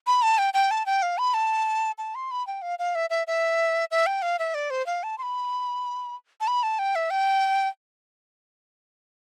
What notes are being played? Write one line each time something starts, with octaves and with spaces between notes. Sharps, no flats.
B5
A5
G5
G5
A5
G5
F5
B5
A5
A5
C6
B5
G5
F5
F5
E5
E5
E5
E5
G5
F5
E5
D5
C5
F5
A5
C6
B5
A5
B5
A5
G5
E5
G5